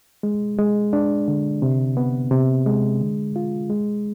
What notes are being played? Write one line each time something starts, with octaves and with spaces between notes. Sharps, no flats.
G#3
G#3
D4
D3
C3
B3
C3
G#3
D3
F4
G#3